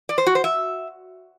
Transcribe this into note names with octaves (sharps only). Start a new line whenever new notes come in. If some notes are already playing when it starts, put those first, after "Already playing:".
D5
C5
F#4
C5
E5